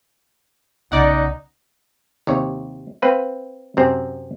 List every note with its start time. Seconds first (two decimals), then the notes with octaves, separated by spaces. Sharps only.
0.92 B1 C#3 D#4 D5 F#5
2.27 D#2 C3 C#5
3.02 C4 B4 F5
3.77 F#2 C3 C4